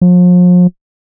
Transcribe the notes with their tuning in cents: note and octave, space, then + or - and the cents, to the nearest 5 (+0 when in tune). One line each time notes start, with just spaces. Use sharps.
F3 +40